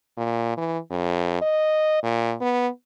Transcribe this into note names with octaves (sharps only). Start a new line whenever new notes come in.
A#2
E3
F2
D#5
A#2
B3